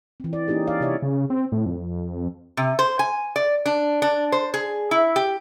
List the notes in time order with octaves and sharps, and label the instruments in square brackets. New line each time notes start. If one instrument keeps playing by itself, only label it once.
[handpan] E3 C4
D5
A#3 C#4 D#4 G4 G#4
D5 F5
C3 G4 C#5 D5 E5
[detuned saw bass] C#3
C4
A2
F2
[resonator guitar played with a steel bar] C3
C5
G#5
D5
D4
D4
C5
G#4
E4
G4